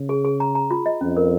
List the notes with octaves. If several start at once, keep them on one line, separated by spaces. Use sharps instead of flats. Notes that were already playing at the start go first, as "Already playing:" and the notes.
Already playing: C#3
G#4
G#4
A#5
A#5
F4
D#5
F2 C#4
A#4